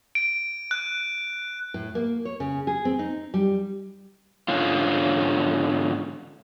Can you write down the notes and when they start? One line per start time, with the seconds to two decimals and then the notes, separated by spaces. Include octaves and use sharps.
0.15 D7
0.71 F#6
1.74 A2
1.95 A#3
2.25 C#5
2.40 C#3
2.67 G#4
2.85 C4
2.99 D#4
3.34 G3
4.48 G#2 D3 C#4 F4